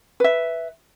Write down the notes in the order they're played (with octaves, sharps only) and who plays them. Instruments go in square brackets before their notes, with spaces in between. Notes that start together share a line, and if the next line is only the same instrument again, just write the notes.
[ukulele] B4 E5